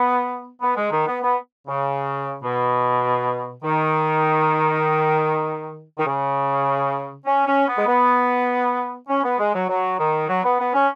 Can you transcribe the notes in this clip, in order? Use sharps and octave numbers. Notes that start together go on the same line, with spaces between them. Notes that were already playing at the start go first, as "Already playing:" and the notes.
Already playing: B3
B3
G#3
D#3
B3
B3
C#3
B2
D#3
D#3
C#3
C#4
C#4
B3
G#3
B3
C#4
B3
G#3
F#3
F#3
D#3
F#3
B3
B3
C#4